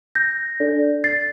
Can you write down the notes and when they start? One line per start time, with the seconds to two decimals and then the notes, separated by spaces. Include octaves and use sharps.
0.15 G6 A#6
0.60 D4 A4 D5
1.04 A6 C7